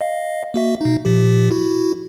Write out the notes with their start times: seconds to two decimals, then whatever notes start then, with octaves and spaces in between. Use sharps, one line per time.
0.01 D#5 F5
0.54 A#3 F#4 E5
0.81 B2 D#4
1.05 A#2 F3 G4
1.51 E4 F#4